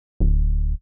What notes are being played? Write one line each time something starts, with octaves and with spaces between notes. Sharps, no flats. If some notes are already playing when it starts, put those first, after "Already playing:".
D1